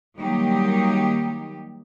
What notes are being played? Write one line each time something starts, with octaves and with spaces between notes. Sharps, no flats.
D#3 F#3 G3 A#3 D#4 G4